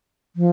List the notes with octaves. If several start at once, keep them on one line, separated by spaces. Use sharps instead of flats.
F3